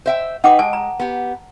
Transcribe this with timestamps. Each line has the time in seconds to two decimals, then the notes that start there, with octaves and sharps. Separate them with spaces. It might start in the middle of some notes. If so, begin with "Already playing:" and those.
0.06 C5 E5 G5
0.44 D#4 B4 F#5 G5 D6
0.59 G#3 G#5 A5
0.73 A#5
1.00 B3 G4